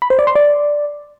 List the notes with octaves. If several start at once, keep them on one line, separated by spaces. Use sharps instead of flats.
B5
C5
D5
C6
D5